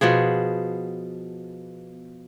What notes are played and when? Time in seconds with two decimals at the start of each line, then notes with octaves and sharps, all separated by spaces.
0.01 B2 F3 B3 G#4